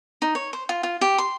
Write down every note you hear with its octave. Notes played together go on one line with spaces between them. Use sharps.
D#4
C#5
C5
F4
F4
G4
C6